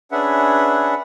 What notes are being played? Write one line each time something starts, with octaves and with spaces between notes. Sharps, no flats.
C#4 D4 G#4 B4 E5 F#5